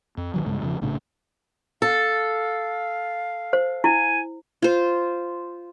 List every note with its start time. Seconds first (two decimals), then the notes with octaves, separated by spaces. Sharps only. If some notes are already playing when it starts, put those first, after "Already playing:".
0.17 F2
0.34 A#1 D#3 F#3
0.45 B1 G2 C#3 G#3
0.61 E1 C#3 F3
0.81 A#1 A2 C#3 D4
1.82 A4 F5
3.53 C5
3.84 E4 G#5
4.62 F4 C5